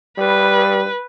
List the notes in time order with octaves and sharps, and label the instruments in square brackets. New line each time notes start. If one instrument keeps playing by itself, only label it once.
[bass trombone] G3 [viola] B4